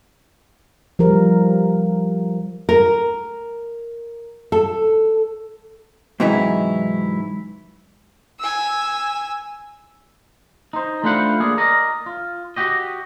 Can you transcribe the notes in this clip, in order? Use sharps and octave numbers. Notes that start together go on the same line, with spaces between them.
F3 G3 A#4
A#4
A4
G#2 C3 E3 F#3 D#4 E4
G#5 E6
D#4 C5
A3 D4 F4 B4 C5 F#5
A#3 G#4 D5
A#4 D5 D#5
F4
F#4 G4 D#5